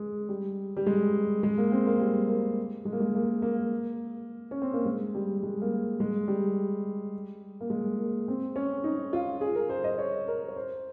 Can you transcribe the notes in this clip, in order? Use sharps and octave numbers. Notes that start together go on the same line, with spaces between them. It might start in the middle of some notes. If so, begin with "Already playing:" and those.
Already playing: G#3
G3
G3
G#3
G#3
A#3
C4
A#3
G3
A#3
G#3
A#3
G#3
A#3
A#3
C#4
C4
A#3
G#3
G3
G#3
A#3
G#3
G3
A#3
G#3
A#3
C4
C#4
D#4
F4
G#4
A#4
C5
D#5
C#5
A#4
C#5
C5